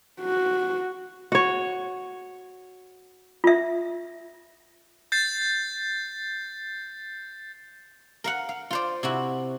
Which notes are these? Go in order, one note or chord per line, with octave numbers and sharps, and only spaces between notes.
F#4
F#4 C#5
F4 E5
G6 A6 C7
A#4 F5 F#5
F5
F4 C5 D5
C3 E4 F#4